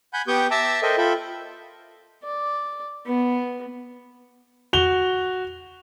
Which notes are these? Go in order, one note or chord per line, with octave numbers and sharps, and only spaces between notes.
F#5 G#5 B5 G6
B3 G4 G5 C#6 D#6 G6
E5 A5 A#5 D6 E6
A4 A#4 C5 D#5 E5 G5
F4 A4 E5 G5 B5
D5
B3
F#4 F7 G7